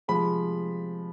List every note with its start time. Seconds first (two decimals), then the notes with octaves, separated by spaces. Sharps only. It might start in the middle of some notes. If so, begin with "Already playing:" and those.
0.08 C3 F3 G#3 B5